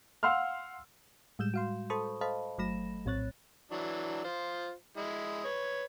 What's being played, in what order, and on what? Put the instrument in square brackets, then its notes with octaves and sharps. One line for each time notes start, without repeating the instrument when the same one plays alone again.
[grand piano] F5 F#5 C6 E6 F6
[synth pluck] A2 G3 G#3 G6 E7
F#4 F5 C6
A4 C5 A5 B5 C#6 D#6
A4 C5 D#5 F5 A5 B5
G1 F#3 A3 B5 A#6 E7
A#1 A2 C4 C#5 F#6 A6
[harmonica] E3 F#3 D4
F4 C5
G#3 E4
B4 C#5